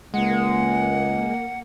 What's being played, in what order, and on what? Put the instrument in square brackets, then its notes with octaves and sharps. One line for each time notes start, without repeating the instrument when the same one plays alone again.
[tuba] C#2 [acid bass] G#3 [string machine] A#3 [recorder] F#5